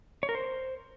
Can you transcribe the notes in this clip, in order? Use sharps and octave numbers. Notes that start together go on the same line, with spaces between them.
C#5
A#4
C5